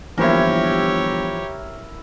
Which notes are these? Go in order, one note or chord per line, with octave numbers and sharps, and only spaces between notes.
G1 E3 F3 A#3 E4 G4 A#4 C#5